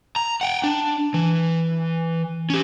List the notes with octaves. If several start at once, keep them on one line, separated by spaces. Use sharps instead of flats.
A#5
F#5 G5
D4
E3
C#4 G4